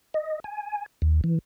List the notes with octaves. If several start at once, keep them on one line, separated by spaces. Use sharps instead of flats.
D#5
G#5
D#2
E3